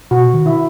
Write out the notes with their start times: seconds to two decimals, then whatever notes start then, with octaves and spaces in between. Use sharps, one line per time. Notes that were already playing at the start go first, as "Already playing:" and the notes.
0.11 B2 F#4
0.34 D#3
0.46 E4